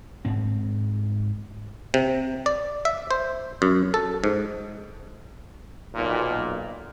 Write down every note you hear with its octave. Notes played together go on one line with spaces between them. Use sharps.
G#2 C4
C3
D5
E5
C5
F#2
A4
G#2
B1 A#2